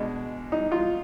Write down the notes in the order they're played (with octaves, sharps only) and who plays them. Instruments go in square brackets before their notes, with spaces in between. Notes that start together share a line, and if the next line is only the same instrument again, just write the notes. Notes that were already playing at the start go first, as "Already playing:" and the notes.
Already playing: [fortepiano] B2 G#3 D4
D#4
F4